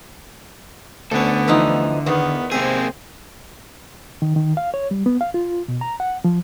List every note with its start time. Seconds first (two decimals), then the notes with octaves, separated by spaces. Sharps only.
1.12 D2 D3 B3 C#4 A4
1.48 E3 F3 D#4
2.06 E2 D#3 B3
2.52 C3 A#3 C4 G#4 E5
4.22 D#3
4.36 D#3
4.57 F5
4.74 C#5
4.91 G3
5.06 B3
5.21 F5
5.34 F4
5.68 B2
5.81 A#5
6.00 F#5
6.25 F3